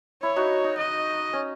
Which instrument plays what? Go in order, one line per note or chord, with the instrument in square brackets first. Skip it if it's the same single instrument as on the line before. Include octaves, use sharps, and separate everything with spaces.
[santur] E4 [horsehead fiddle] C#5
[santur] D#4 F#4
D#4
[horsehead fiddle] D#5
[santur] C#4